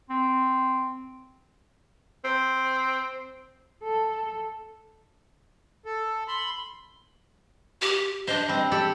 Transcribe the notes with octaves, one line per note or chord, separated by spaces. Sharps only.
C4
C4
A4
A4
B5 C6
G4
D4 C5 D#5
G3 C4
G4 A4 D5